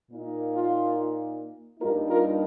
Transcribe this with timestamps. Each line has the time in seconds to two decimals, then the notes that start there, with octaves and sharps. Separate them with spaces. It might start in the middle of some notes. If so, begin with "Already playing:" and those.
0.11 A#2 A#3 D#4
0.53 F4
1.80 G2 G3 A#3 D#4 F4 A#4
2.08 F4 A#4